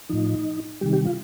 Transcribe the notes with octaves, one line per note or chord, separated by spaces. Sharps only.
A2 F3 D#4
C3 D#3 G3 G4
G4
F4